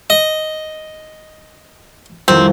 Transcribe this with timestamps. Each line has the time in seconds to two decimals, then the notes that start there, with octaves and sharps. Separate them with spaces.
0.10 D#5
2.28 C2 F2 D#3 C4